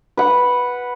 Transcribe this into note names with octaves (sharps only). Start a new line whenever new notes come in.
B4 F#5